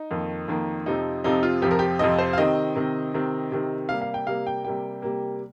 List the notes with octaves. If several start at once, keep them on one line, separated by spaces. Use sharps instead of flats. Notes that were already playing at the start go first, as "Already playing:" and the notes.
Already playing: D#4
F2 D#3 A#3
F2 D#3 A#3
F2 C3 F3 C4 D#4
F2 C3 F3 C4 D#4
F4
F2 C3 F3 C4 G4
A#4
G4
F2 C3 F3 C4 D#5
C5
F5
C3 D#3 C4 D#5
C3 D#3 C4
C3 D#3 C4
C3 D#3 C4
C3 G3 A#3 F5
F5
G5
C3 G3 A#3 F5
G5
C3 G3 A#3 G5
C3 G3 A#3